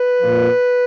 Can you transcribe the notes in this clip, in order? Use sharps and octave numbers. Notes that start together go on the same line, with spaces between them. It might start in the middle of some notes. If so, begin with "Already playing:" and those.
Already playing: B4
A#2 F3